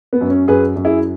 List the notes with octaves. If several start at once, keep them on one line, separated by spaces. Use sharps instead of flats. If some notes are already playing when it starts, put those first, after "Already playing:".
B3
F#2
C#4
F#2 G#4 B4
F#2
E4 G#4